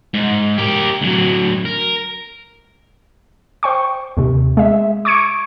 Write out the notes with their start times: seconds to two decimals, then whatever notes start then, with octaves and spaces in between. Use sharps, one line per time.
0.14 G#2
0.58 G4 A#4
1.01 D2 F#3
1.65 A#4
3.63 C5 G5 C#6
4.17 D#2 C3
4.57 G#3 E5
5.05 C#6 D6 G#6 C#7 D7